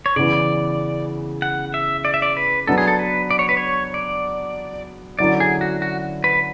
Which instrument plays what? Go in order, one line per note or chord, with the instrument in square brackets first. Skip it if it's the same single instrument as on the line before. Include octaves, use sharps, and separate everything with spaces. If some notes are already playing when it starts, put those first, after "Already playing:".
[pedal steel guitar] C#5
[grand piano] C#3 E3 B3 [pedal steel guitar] D5
[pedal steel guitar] F#5
E5
D5
E5
D5
B4
[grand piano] F#3 B3 D4 [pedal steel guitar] A4
[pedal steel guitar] G#4
A4
B4
D5
C#5
B4
C#5
D5
[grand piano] D3 F#3 C#4 E4 [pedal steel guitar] D5
[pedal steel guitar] G#4
F#4
F#4
B4